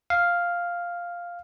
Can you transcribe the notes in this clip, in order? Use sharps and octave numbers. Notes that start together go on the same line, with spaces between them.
F5